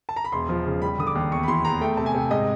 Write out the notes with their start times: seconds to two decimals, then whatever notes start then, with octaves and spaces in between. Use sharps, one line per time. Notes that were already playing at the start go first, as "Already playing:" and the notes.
0.09 A5
0.16 A#5
0.24 B5
0.32 E1 C6
0.49 F3
0.66 C#3
0.82 G3 B5
0.98 D3 D#6
1.07 D6
1.15 D#2
1.31 E2 C#6
1.43 B5
1.48 E3 C6
1.65 E2 A#5
1.81 A3 G5
1.97 C3 A5
2.06 G#5
2.14 C3
2.31 G#2 D#5